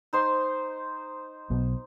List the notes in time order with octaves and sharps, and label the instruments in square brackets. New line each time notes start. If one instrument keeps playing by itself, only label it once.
[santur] D#4 C5 C6
[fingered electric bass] B1 B2